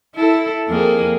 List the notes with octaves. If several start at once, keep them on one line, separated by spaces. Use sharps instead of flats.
E4 A4
F2 A#3 G#4